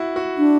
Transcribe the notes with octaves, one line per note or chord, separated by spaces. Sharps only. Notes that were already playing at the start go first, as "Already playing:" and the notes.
Already playing: E4 F#4
F#4
D4